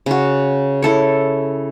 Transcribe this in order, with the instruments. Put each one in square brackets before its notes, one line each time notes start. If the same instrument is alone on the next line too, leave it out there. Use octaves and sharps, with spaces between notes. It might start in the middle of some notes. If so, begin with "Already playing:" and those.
[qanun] C#3 F#4
E4 A4 C#5